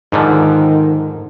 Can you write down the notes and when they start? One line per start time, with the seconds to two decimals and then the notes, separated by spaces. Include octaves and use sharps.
0.12 G#2 D3 D#3 F3